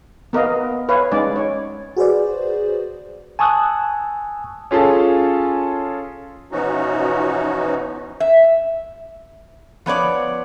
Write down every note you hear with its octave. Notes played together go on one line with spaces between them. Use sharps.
B3 A#4 D#5 F5
B4 C#5 F5
G#3 C#4 D#4 D5
C#5
F#4 G#4 B4 C5 D5
G#5 A5 C#6 D#6 E6 F#6
C#4 F4 G#4 A4
B2 E3 F3 C#4 D#4 F#4
E5
F3 B3 C#5 D5